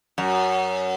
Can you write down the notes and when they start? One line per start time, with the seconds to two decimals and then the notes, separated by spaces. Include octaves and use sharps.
0.18 F#2